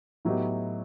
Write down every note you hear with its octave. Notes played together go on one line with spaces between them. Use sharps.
A2 F#3 B3 D#4 G4